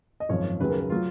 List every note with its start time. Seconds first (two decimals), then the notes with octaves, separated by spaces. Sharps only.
0.20 D#5
0.29 G#1 F#2 F3 C#5
0.60 D#2 C#3 F#3 B4
0.70 A#4
0.81 A#4
0.90 F#3 F4